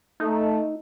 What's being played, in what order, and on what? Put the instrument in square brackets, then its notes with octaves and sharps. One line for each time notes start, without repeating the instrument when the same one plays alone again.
[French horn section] A3 [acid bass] D#4